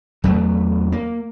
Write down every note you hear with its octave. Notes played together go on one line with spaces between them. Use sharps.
E2 F#3 A3
A#3